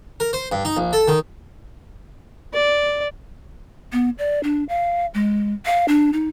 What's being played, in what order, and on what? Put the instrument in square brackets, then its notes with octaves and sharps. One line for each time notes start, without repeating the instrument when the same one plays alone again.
[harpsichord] A#4
C5
G2
D#4
A#1
A4
D#3
[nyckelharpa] D5
[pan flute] B3
D5
D4
F5
G#3
F5
D4
D#4